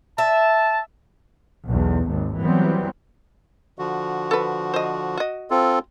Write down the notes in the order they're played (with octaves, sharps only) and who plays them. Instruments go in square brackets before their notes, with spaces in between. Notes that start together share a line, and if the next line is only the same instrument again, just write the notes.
[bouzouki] E5 [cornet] A5
[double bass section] B1 E2
G#1 D#2
E3 F#3 G3 B3 C4
[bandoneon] D3 F3 F#4
[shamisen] A4 B4
C5 D#5
F#4 D#5
[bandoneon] C4 F4 A4